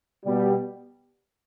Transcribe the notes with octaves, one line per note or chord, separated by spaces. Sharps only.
B2 G3